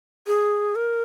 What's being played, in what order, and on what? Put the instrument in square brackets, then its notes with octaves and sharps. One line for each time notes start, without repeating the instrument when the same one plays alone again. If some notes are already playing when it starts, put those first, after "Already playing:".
[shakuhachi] G#4
A#4